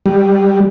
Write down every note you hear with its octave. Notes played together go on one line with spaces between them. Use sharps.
G3